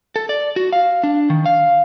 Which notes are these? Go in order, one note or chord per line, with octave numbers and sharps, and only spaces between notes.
A4
D5
F#4
F5
D4
D#3
F5